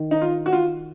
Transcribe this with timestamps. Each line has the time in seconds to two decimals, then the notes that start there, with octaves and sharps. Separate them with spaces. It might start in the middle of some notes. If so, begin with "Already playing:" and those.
Already playing: D#3
0.11 D#4
0.21 F4
0.46 F#4
0.53 F4